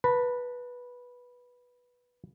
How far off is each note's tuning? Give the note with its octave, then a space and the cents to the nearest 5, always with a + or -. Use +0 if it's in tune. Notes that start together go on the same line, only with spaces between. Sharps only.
B4 -10 A5 +40